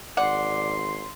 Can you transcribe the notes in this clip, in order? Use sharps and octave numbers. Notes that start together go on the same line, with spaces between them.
G#1 D5 F#5 C6